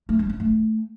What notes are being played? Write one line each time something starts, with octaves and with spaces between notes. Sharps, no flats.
A3
G#3
C#4
A3